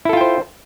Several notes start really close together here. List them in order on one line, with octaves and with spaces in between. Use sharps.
E4 A4 F4 G5 C5